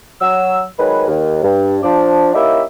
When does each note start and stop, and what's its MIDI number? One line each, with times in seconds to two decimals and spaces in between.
0.21 0.62 54
0.21 0.62 88
0.79 1.04 51
0.79 1.04 54
0.79 1.04 56
0.79 1.04 71
1.08 1.39 39
1.43 1.78 43
1.83 2.33 53
1.83 2.33 62
2.34 2.62 58
2.34 2.62 61
2.34 2.62 63
2.34 2.62 64
2.34 2.62 67
2.34 2.62 76